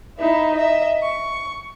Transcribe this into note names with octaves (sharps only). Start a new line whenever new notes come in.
D#4 E4 E5
D#5 E5
C#6